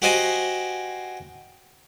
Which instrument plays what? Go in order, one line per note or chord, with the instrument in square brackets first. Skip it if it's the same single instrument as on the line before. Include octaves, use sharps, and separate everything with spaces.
[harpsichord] F#4 G4 C5 D#5 F5 G#5